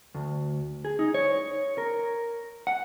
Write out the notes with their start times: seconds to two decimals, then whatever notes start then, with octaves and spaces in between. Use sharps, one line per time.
0.15 D2
0.85 G#4
0.99 D#4
1.14 C#5
1.78 A#4
2.67 F#5